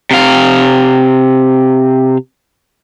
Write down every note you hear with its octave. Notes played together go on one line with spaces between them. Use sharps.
C3 F5